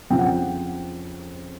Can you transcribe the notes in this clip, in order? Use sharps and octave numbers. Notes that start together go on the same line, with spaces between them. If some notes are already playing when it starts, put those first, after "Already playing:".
F2 C#3 F3 G5
F#5
G5